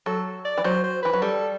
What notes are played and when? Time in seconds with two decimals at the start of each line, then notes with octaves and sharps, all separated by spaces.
0.06 F#3 A4
0.45 D5
0.57 E3
0.64 F#3 C5
0.84 C5
1.03 E3 B4
1.13 F#3
1.22 G3 A4